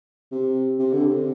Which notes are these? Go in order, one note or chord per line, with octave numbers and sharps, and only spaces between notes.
C3
C3
D3
C3